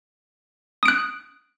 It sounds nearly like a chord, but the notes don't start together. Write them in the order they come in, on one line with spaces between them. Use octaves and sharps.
D#6 D7 F#6